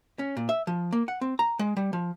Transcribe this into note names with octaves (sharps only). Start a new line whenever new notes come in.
C#4
A#2
E5
F3
A#3
F#5
C4
A#5
G#3
G3
F3